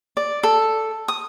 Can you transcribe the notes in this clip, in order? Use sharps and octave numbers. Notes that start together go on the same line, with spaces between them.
D5
A4
D#6